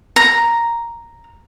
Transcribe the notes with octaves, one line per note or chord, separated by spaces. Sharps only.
A#5